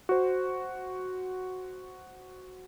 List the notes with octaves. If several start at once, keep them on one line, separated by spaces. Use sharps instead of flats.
F#4 C5